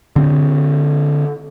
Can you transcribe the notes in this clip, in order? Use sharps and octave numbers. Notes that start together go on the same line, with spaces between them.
D3 C4